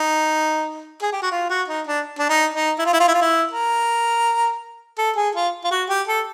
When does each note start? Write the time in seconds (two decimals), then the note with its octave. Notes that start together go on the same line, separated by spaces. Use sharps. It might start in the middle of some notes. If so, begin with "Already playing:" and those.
Already playing: D#4
1.02 G#4
1.12 G4
1.22 F#4
1.32 F4
1.50 F#4
1.68 D#4
1.87 D4
2.19 D4
2.29 D#4
2.54 D#4
2.79 E4
2.86 F4
2.93 E4
3.00 F4
3.08 E4
3.14 F4
3.22 E4
3.52 A#4
4.98 A4
5.17 G#4
5.35 F4
5.64 F4
5.71 F#4
5.89 G4
6.08 A4